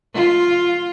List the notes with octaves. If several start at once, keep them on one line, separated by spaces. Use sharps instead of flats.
F4